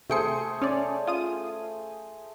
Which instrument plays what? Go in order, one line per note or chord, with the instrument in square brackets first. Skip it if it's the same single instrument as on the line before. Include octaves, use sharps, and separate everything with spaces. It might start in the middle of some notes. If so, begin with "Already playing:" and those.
[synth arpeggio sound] C3 G5 C#7 [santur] A3 G#4 C5
[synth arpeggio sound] C#4 C#5 D5
F4 D#6 D#7